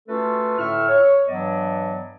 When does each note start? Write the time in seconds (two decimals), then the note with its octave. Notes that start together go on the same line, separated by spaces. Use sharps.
0.09 A3 C#4 F4 F#4 A4 B4
0.59 A2 D3 E5 C#6 E6 F6
0.88 C#5
1.27 G2 E3 F#3 B3 D5 D#5